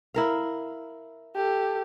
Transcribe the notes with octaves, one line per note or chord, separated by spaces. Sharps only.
E4 A#4 F5
G4 A4